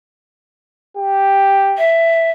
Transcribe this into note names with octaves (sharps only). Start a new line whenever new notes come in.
G4
E5